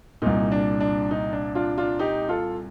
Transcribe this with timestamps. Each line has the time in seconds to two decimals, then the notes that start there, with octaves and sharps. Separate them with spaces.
0.22 C2 A#2 D#4
0.52 D4
0.81 D4
1.11 D#4
1.33 D4
1.55 D4 F4
1.78 D4 F4
1.99 D#4 G4
2.29 F4 A4